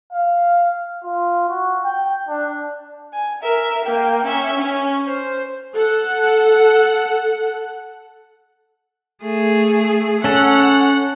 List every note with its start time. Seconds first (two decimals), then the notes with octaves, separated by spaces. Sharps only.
0.12 F5
1.04 F4
1.49 F#4
1.84 G5
2.28 D4
3.13 G#5
3.42 A#4 E5
3.85 A#3 G5
4.25 C#4 E5
4.59 C#4
5.06 C5
5.73 A4 F#5
9.23 A3 G#4
10.24 C#4 A4 F#5